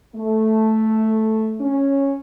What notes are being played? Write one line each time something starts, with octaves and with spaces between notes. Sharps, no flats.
A3
C#4